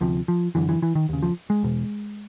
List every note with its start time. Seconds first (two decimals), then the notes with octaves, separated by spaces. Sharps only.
0.01 D2 C3 F3
0.28 F3
0.55 F#2 D3 E3
0.69 E3
0.82 E3
0.95 D#3
1.09 D#2 C#3
1.23 F3
1.50 G#3
1.63 E2 B2